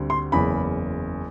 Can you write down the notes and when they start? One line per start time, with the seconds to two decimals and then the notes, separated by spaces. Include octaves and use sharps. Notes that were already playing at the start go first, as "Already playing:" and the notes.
Already playing: D2 D3 G3 C4
0.10 C6
0.32 F#1 E2 C#3 B5